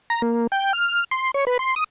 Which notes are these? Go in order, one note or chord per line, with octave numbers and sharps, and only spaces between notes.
A#5
A#3
G5
F6
C6
C#5
B4
C6
D#6